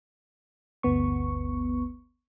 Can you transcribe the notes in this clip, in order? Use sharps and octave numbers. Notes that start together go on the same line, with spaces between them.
G1 D2 B3 C#6